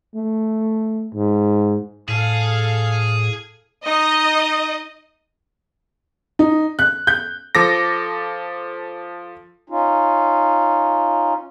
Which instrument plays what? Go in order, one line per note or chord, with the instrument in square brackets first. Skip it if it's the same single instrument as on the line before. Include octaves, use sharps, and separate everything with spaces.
[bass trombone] A3
G#2
[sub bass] A2 [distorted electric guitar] G#4 [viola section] A4 F5
[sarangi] D#4 [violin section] D#5
[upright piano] D#4
F#6
G6
[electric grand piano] F3 A4 D6 A#6
[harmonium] C#4 D#4 F4